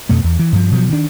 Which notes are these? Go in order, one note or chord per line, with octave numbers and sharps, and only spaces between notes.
F2 B2 A3
E2
E3
G2 F3
B2 F3 F#3
D#3 D4